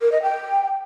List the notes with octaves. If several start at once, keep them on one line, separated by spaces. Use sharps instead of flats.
A#4
D#5
G5